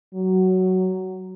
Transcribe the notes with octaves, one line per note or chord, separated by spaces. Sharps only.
F#3